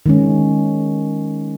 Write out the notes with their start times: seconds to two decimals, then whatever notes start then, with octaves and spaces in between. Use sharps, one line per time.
0.06 D#3 G#3 C#4